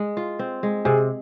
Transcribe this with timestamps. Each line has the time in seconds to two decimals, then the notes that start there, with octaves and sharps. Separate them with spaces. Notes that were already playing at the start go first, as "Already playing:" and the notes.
Already playing: G#3
0.17 F4
0.39 C4
0.63 G#3
0.85 C3 G#4